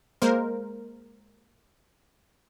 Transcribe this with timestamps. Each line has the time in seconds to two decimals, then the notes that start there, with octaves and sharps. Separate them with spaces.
0.22 G#3 A#3 A#4 C5